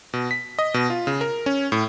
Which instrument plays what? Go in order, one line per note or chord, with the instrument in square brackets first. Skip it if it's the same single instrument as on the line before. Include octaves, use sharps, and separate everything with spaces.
[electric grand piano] B2
B6
D#5
B2
F4
C#3
A#4
C#4
A2